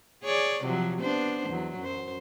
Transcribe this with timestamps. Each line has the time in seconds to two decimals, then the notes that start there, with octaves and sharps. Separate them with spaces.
0.24 G#4 C#5 D5
0.64 C3 F3 F#3
1.01 B3 D4 C5
1.49 E2 F#3
1.79 F#2 C5